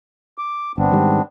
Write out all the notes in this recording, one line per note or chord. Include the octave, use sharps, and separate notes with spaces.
D6
G1 B3 C4 D4
G#2 D#3 G3